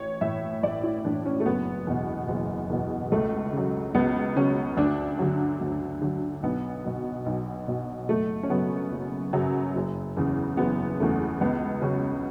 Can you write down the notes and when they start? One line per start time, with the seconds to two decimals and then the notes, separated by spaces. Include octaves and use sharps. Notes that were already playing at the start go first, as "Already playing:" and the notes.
Already playing: A1 C#5
0.21 A2 E3 E5
0.63 A1 D5
0.84 E4
1.04 A2 E3 D4
1.26 C#4
1.40 A3
1.45 F#1 B3
1.87 E2 B2
2.28 F#1
2.70 E2 B2
3.12 C#2 A3
3.53 C#3 F#3
3.95 C#2 B3
4.36 C#3 F#3 C#4
4.77 D2 D4
5.19 D3 F#3
5.61 D2
6.02 D3 F#3
6.43 B1 B3
6.84 B2 F#3
7.26 B1
7.68 B2 F#3
8.09 F#1 A3
8.43 C#4
8.50 F#2 C#3 F#3 B3
8.92 F#1
9.33 F#2 C#3 F#3
9.75 F#1
10.17 E2 C#3
10.57 F#1 B3
11.00 E2 C#3 A3
11.41 C#2 B3
11.82 C#3 F#3 C#4